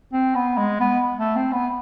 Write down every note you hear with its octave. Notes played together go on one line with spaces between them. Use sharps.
C4
B3
G#3
B3
A3
C4
B3